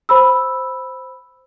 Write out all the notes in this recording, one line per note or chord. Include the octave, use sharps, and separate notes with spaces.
C5 B5 E6